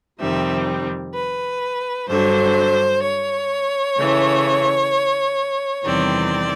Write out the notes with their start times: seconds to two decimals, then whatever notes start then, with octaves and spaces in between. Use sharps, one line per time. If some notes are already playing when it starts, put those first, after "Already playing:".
0.19 F2 C3 D#3 G3 C4 E5
1.13 B4
2.07 G2 D3 F#3 C5
3.02 C#5
3.96 C#3 E3 A3
5.85 E2 C3 D#3 G3 C4 D5